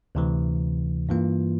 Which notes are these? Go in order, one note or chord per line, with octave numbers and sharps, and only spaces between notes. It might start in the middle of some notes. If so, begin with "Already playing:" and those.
D2 C3 E3
G2 E3 A#3 F4